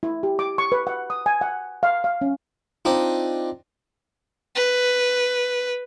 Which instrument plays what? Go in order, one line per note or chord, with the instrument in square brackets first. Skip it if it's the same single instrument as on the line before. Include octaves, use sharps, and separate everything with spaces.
[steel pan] E4
G4
D6
C#6
B4
F#5
D#6
G#5
F#5
F5
F5
C#4
[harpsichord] C4 D4 D#4 [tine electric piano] F4
[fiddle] B4